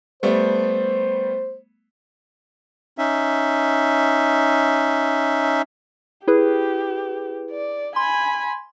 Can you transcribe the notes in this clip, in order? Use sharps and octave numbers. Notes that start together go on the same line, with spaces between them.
G3 A3 B3 C5
C#4 D#4 E5
E4 G4 G#4 B4
D5
G#5 B5 C6